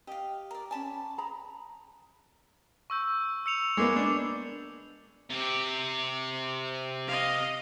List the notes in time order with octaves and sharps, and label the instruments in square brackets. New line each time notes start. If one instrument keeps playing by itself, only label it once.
[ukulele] G4 G5 [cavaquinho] D#5 F5
[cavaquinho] A#4 D5
[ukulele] C#4 G#5 [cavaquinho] D5 A5 B5
[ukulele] G#4 A#5 B5
[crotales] C#6 E6 G6
E6 C#7 F7
[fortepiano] G#3 A#3 B3 [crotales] D6
[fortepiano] D4
[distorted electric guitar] C3 G4
[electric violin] D#5 F5